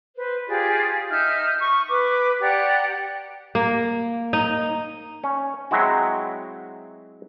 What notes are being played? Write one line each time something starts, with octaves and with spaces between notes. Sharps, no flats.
B4 C5
F4 G4 G#4 D5
D#4 E5 F6 G6
C#6
B4 D6
G4 D5 F#5 A#5
A#3
D#4
C#4
F#3 G#3 C4 E4 F#4